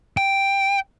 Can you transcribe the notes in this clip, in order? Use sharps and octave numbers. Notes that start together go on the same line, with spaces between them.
G5